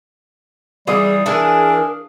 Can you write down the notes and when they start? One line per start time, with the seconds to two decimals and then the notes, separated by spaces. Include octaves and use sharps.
0.87 E3 G3 G#4 F5 D#6
1.26 E3 D4 G#4 A#4